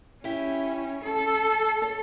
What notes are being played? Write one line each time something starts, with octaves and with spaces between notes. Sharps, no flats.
C#4 E4 G4
A4
A4 C#5